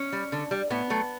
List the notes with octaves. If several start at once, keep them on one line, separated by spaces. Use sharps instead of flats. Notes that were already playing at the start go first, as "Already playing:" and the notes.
Already playing: C#4
G3
D3
G3
A2 B3
F#3 A3